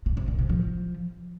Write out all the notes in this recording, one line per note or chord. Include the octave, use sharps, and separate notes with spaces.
A#2
C3
A#2
C3
F3